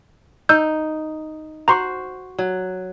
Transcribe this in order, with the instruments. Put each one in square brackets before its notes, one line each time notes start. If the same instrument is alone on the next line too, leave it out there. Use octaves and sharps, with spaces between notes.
[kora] D#4 [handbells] E6 G6
[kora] F#4 C5 [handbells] A#5 C6 C#6
[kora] F#3